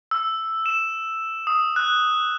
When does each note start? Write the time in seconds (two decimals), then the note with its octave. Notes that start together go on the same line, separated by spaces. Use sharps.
0.11 E6
0.66 E7
1.47 D#6
1.76 F#6